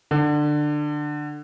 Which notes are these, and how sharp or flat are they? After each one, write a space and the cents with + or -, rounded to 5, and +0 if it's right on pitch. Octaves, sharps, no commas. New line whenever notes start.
D3 +20